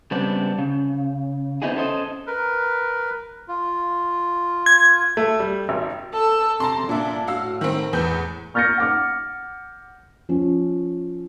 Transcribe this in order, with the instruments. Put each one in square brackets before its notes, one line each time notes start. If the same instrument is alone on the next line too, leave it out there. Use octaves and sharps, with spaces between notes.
[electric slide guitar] C#3 G3 B3 C4 D4
C#3
B3 C4 D#4 E4 F#4 G#4
C#4 A4 C5 D#5
[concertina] A#4 B4
F4
[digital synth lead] G#6
[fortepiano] A3
G3
G#1
[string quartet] A4 E6
[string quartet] C3 [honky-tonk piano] A5 A#5 C6
[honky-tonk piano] A#2 E5 [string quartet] D4
[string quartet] A2 [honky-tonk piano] F#4 F5 E6
[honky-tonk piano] D#3 C4
E2 B4 G6
[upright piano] C#6 F6 G6 A6 A#6 C#7
F#5 D6 F6
[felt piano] F3 C#4